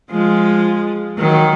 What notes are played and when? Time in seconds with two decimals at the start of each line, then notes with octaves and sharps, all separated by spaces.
0.11 F3 G#3
1.18 D#3 F#3